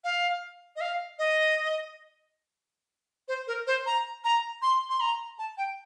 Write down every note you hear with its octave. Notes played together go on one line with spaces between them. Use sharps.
F5
D#5
F5
D#5
C5
A#4
C5
A#5
A#5
C6
C6
A#5
A5
G5